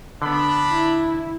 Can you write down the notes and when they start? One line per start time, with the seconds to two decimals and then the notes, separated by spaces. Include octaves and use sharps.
0.22 D3 B3 D4 B5
0.71 E4